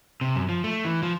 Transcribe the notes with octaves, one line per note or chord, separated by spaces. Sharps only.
C3
F#2
F3
A3
E3
F3